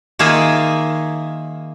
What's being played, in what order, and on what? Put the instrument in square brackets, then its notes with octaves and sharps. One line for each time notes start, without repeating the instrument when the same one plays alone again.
[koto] D#3 A#3 F4 G#4 E5 G#5